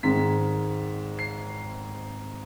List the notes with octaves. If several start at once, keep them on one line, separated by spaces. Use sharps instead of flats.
G#1 G#2 D#3 G#3 B6
C7